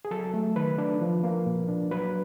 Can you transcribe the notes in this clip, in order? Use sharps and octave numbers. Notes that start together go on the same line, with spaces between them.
G#4
F#3 A4
A3
D#3 B4
D4
F3
A#3
A#2
D4
F#3 B4